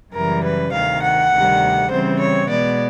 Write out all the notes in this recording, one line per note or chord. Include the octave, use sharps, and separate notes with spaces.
F#2 C#3 E3 G3 A#4
B4
D2 C3 D#3 F5
F#5
D2 C3 D#3 G3
C#3 E3 G3 C4 C5
C#5
B2 G#3 B3 D5